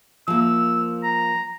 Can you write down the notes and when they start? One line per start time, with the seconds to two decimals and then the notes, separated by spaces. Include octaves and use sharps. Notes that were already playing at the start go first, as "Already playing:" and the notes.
0.28 F3 A#3 E6
1.03 A#5